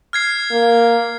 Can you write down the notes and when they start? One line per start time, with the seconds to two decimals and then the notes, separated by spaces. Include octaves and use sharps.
0.13 F6 G#6 C7
0.52 A#3